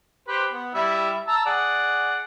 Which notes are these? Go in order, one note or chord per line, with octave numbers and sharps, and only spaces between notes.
G4 B4 C5
B3
G3 E4 E5
A5 A#5 E6
G#4 D5 F#5